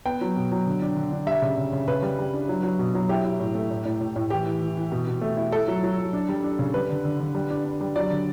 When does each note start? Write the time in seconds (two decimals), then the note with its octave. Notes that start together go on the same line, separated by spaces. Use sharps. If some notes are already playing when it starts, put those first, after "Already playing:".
0.06 B3 G5
0.21 F#3
0.36 B2
0.51 F#3
0.67 D3
0.82 D4
0.97 D3
1.12 D4
1.27 G3 E5
1.42 C#3
1.57 C#3
1.73 C#3
1.88 C#3 B4
2.02 G3
2.19 G3
2.34 D4
2.49 F#3
2.63 F#3
2.79 B2
2.95 F#3
3.09 E4 G4
3.25 E4
3.40 A2
3.55 A3
3.71 A2
3.85 A2
4.00 A2
4.16 A2
4.30 E3 G4
4.46 E3
4.62 E3
4.77 E3
4.92 B2
5.07 B2
5.21 A3
5.37 E4
5.52 E4 A4
5.68 F#3
5.83 F#3
5.98 F#3
6.13 D4
6.29 G3
6.44 D4
6.59 C#3
6.74 G3 B4
6.89 D3
7.05 D3
7.20 D3
7.35 G3
7.50 D4
7.65 D4
7.81 G3
7.96 F#3 D5
8.10 D3